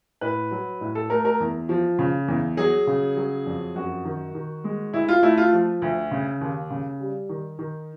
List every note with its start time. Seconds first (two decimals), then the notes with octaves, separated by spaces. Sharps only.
0.21 A2 B4
0.51 F#3
0.81 A2
0.95 A4
1.10 A3 A#4
1.25 A#4
1.40 E2
1.69 F3
1.99 C#3
2.28 E2
2.57 F#3 G#4
2.87 C#3
3.17 F#3
3.46 F2
3.75 F#2 F#4
4.05 D#3
4.35 D#3
4.64 G#3
4.93 D2 E4
5.08 F4
5.23 A3 E4
5.38 F4
5.52 F3
5.82 D2
6.11 C#3
6.41 D#2
6.70 C#3
7.00 G3
7.29 D#3
7.59 D#3